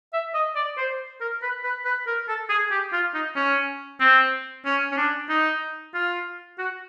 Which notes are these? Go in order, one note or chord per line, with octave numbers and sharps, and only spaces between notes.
E5
D#5
D5
C5
A#4
B4
B4
B4
A#4
A4
G#4
G4
F4
D#4
C#4
C4
C#4
C#4
D4
D#4
F4
F#4